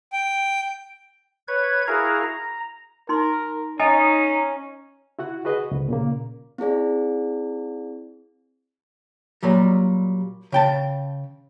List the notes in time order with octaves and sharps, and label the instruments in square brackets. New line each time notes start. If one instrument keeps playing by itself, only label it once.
[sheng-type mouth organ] G5
[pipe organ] B4 C#5 G#6
E4 F#4 G#4 A#4 F5 A#5
A#5
[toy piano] D#4 C6 [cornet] A#4
[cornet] C#4 [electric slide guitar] D#4 [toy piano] D#5 G#5
[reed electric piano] E4 F#4 F#5
F#4 G#4 B4 D#5
C#2
A#2 C#3 A#3
[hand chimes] C4 E4 G#4 D5
[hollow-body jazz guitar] A#2 F#3 G3
C#3 G5 A5